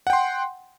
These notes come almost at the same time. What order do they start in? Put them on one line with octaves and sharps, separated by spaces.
F#5 G5 C6